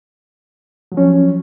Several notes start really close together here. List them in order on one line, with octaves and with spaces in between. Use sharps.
F#3 F3 C#4